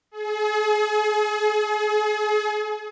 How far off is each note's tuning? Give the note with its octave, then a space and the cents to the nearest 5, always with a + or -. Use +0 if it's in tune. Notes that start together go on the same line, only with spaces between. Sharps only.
G#4 +40